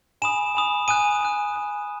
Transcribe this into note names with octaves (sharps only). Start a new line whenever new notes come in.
G#5 B5 D#6 E7
G#5 B5 D#6
G#5 D#6 F#6 D#7
G#5 D#6 F#6
G#5 D#6 F#6